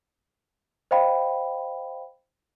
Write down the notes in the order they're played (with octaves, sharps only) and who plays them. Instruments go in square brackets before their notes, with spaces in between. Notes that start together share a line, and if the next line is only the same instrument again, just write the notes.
[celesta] C5 D#5 F5 G5 B5